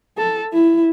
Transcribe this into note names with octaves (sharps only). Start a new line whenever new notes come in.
A4
E4